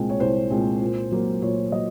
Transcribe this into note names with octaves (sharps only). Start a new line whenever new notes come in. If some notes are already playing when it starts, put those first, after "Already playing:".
Already playing: C2 A#2 G#3 C4
C#5
C2 C5
A#2 G#3 C4
A#2
F#3 A#3
A#2 C#5
F#3 D#5